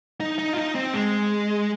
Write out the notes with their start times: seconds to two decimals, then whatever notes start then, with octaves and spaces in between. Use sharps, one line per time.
0.20 D#4
0.39 D#4
0.53 F4
0.57 D#4
0.75 C4
0.94 G#3